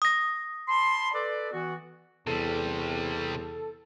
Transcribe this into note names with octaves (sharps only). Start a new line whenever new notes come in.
D#6 A#6
A5 B5 C6
A4 B4 D5
E3 B3 F#4
E2 C3 G3 A4